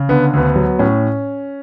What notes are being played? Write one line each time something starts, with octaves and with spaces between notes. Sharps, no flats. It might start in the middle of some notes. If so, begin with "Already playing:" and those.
Already playing: C#3
D3 B3
D2 B3
F#3
A2 C#4